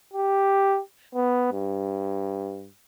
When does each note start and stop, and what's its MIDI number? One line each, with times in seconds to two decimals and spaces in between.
0.13 0.80 67
1.15 1.50 59
1.53 2.69 43